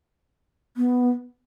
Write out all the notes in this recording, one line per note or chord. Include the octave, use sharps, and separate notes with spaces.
B3